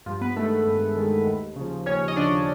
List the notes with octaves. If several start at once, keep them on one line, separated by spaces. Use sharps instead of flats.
G2 F3 F4
B3 B4
D#3 G#3 A3 A4
G2
D#3 G#3
D#2
C#3 F3
D#2 C#4 C#5
D#5
C#3 F3 D4 D5